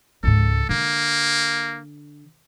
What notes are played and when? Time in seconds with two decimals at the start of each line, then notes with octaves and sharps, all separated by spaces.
0.23 C#2 G#2 A4
0.69 D3 A#3